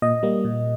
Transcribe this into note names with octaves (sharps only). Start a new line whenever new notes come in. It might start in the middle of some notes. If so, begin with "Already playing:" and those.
A#2 D#5
G3 A#3
A#2